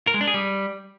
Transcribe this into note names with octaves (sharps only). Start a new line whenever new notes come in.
A#4
G#3
D4
G#4
G3